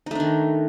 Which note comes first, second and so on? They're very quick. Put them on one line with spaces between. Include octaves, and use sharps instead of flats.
D#4 A3 D4 D#3